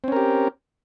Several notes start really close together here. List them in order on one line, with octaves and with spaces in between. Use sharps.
C4 C#4 A#4 G4